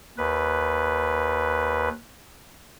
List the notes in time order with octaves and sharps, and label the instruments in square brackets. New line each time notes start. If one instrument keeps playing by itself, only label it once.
[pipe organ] D#2 B4